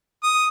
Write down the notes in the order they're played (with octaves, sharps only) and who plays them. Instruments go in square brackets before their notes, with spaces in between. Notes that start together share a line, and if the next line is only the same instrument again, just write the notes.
[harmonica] D#6